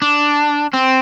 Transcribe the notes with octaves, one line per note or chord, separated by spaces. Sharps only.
D4
C4